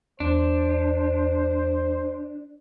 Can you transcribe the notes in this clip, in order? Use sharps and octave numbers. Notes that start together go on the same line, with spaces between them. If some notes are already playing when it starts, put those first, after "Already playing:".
E2 D4 C5